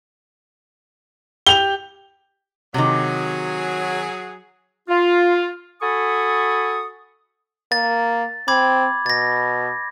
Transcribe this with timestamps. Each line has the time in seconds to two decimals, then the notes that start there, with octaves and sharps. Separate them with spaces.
1.47 G4 F7 G7
2.74 C3 D#3 F#3 G#4
4.88 F4
5.82 F#4 A4 G#5 B5 C#6 D#6
7.72 A#3 A6
8.48 C4 B5 D6 G#6
9.06 B2 A6 A#6